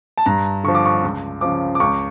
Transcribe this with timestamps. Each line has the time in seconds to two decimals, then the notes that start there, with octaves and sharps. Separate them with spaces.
0.18 A5
0.26 G2 A#5
0.64 D3 F3 C#6
0.75 D6
0.86 C#6
1.03 C#2
1.41 C#3 F3 D6
1.75 D6
1.80 C#2 C#6